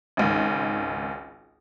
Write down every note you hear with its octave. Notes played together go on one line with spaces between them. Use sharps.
G#1 C#2 D#3